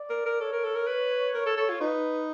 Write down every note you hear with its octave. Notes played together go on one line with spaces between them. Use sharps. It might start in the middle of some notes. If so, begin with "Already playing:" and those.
Already playing: D5
A#4
A#4
A4 C#5
A#4
A4
A#4
B4
A#4
A4
A4
F4
D#4 B4